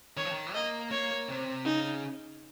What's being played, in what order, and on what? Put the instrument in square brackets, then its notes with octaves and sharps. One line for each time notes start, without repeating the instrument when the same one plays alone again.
[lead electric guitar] D#3 [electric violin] C#5
[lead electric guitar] F3
D#3
[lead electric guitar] A#3 [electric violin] D#5
[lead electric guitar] A#3 [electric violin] C#5
[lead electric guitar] C3
[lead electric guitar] C#3 [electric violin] D#4